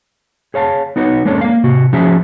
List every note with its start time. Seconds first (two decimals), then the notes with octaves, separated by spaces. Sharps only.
0.54 G#4 C#5 F5 A5
0.96 B3 D#4 F#4 B4 C#5
1.25 G#3 A#3 C#4 D4 A4 C#5
1.41 A#3 F5
1.64 C3 F#4
1.93 F3 C#4 F#4 G#4 E5